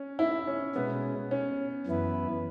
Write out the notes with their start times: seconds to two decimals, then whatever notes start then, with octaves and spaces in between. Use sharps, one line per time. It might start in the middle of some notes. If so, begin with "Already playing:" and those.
Already playing: C#4
0.19 E4
0.47 C#4
0.76 B2 G#3 B3 C#4
1.31 C#4
1.87 F#2 E3 B3 E4 B4